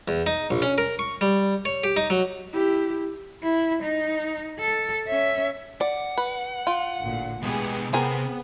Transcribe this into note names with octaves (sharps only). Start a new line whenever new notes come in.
E2
D#4
A#1
C#4
A#4
C#6
G3
C#5
G4
D#4
F#3
E4 G4
E4
D#4
A4
C#4 E5
D5 F#5
B4
F4
A1 D2 A#2
B2 G#3 B3 G4 G#4
C3 B3 C4 G#4 A#4